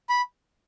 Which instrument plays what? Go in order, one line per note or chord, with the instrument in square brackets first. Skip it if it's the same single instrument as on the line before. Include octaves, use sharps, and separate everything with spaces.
[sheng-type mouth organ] B5